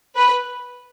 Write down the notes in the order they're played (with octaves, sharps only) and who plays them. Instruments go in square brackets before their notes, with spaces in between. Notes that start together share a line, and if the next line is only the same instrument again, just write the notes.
[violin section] B4